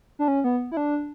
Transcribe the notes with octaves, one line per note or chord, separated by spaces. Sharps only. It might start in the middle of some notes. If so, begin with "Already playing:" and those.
D4
C#4
B3
E4
D4